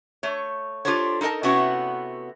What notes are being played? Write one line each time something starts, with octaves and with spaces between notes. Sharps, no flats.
A3 C#5
D4 F4 G4 A4 C5 C#5
D#4 A4 A#4 D#5 A5
C3 A3 B3 C#4 E4 F#4